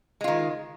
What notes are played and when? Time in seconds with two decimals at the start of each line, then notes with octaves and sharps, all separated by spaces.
0.21 G#3
0.24 F4
0.28 D#3